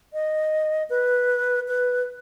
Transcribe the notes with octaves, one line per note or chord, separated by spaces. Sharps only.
D#5
B4
B4